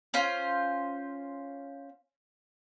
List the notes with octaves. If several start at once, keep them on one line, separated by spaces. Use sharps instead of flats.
C#4 F4 C5